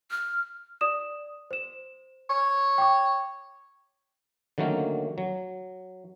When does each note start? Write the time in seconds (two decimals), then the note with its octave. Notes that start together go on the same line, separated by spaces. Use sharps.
0.11 F6
0.81 D5 D#6 E7
1.51 C5 E7
2.30 C#5
2.78 G5 C#6 D6
4.58 D3 D#3 F#3 A3 A#3 C#4
5.18 F#3